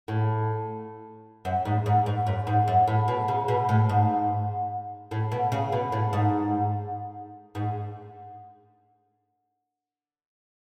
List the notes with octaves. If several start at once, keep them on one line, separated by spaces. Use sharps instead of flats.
A2
F#2
G#2
G#2
G#2
F#2
G#2
F#2
A2
B2
C#3
B2
A2
G#2
A2
B2
C#3
B2
A2
G#2
G#2